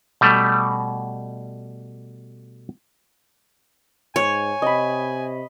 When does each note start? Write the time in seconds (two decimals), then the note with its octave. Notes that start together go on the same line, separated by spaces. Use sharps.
0.21 B2 G3 A3
4.16 G#2 C#5 G#5
4.62 C3 D#5 B5